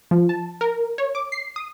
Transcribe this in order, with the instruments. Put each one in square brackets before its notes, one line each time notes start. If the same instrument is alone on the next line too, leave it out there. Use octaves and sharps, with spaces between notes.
[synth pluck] F3
A5
A#4
C#5
D6
C7
D#6